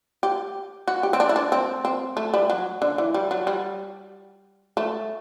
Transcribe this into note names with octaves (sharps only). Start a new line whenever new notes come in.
G4
F#4
G4
C4
D4
E4
D4
C4
C4
A3
G3
F#3
D3
E3
G3
F#3
G3
A3